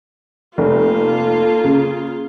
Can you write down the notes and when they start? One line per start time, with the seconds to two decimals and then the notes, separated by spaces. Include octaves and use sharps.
0.58 F1 A#3 F4 A4
1.64 C#3